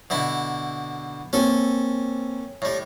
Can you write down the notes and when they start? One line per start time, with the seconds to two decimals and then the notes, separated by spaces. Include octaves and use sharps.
0.10 B2 D3 E4
1.33 A#3 C4 C#4 A4
2.62 A2 G3